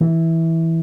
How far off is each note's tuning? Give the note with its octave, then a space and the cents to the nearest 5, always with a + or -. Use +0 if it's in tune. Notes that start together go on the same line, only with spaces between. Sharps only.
E3 -10